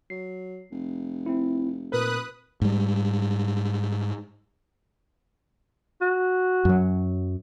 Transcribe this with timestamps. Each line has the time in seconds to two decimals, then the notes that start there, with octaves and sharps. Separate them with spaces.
0.10 F#3 C7
0.72 F1
1.26 C4 E4
1.92 A#2 A#4 B4 D#6 F#6
2.62 G#2 G3
6.01 F#4
6.65 F#2 F#3